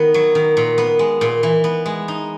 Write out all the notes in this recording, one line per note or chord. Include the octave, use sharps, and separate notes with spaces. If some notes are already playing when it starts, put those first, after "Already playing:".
Already playing: D#3 B3
F#3
D#3
A#2
B3
G#3
A#2
E3
B3
G#3
D#4